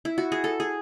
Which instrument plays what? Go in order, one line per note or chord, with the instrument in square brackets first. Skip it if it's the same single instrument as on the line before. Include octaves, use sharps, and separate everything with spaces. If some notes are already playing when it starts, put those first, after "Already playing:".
[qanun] E4
F#4
G#4
A4
G#4